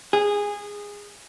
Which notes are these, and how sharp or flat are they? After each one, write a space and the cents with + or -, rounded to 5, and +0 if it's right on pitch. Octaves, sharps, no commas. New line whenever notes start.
G#4 -15